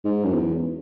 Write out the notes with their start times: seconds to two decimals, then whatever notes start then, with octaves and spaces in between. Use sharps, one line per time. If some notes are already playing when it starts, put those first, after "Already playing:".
0.05 G#2
0.24 F#2
0.33 E2